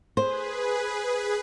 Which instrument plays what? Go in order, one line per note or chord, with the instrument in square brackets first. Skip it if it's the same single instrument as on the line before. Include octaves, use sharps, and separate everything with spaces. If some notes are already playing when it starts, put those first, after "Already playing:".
[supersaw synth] G#4 B4 [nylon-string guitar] C5